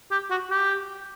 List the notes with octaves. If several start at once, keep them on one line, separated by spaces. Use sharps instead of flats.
G4
F#4
G4